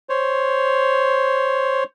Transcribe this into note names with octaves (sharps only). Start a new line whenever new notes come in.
C5 C#5